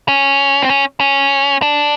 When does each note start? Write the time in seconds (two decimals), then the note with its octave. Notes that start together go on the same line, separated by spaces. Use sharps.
0.08 C#4
0.62 C4
0.69 C#4
1.00 C#4
1.62 D4